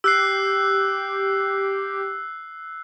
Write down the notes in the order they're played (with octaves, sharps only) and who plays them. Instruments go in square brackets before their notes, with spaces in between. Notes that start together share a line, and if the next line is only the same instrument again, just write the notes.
[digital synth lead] G4 [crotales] E6 F#6 C7